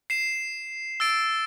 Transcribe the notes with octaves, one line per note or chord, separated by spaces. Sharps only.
C7 E7
E6 A6 D7